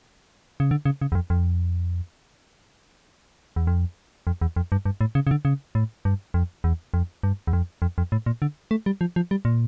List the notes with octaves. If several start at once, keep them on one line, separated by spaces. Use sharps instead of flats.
C#3
D3
C#3
C#3
E2
F2
F2
E2
F2
F2
E2
F2
G2
G2
A2
C#3
C#3
D3
C#3
A2
G2
F2
E2
F2
G2
E2
F2
F2
F2
A2
A#2
D3
A3
G3
F3
F3
G3
A#2